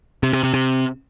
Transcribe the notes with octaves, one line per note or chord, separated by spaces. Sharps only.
C3
C3
C3
C3